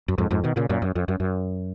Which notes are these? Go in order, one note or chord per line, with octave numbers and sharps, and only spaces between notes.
F#2
F2 G#2
F2 G#2
B2 D#3
A#2 C#3
F#2 A#2
F#2
F2
F#2
F#2